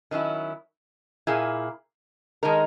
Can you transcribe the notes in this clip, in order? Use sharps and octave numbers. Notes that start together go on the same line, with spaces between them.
D#3 F#3 C#4 E4
A#2 A#3 E4 G#4
D#3 G#3 D#4 A#4